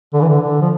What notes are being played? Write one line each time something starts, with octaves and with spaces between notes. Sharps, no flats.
D3
E3
D3
D3
F3